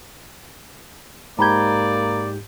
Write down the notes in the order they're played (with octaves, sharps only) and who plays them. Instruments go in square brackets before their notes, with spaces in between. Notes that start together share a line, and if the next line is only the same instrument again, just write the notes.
[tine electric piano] G#2 G4 G6 [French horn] A#3 [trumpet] D5 [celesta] A#5 B5 G#6